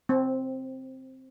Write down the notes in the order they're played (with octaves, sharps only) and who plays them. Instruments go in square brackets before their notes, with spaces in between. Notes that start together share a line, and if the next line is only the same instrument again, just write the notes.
[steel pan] C4